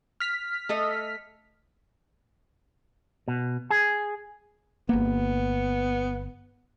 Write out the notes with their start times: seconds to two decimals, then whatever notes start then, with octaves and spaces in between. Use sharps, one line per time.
0.20 F6 B6
0.69 A3 A4 D#5
3.28 B2
3.70 G#4
4.89 G1 A#3 B3